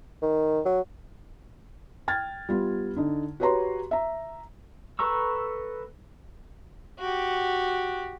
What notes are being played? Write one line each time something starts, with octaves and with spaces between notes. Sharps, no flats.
D#3
F#3
G5 F6 G#6 A6
G3 B3 F4
D3 D#4
F#4 G4 B4 C#5 A#5 C6
E5 A#5
A4 B4 A#5 C#6 E6
F#4 G4